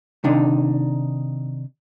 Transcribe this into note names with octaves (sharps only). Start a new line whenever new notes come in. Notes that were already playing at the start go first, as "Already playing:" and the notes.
C3 D#3 D4 D#4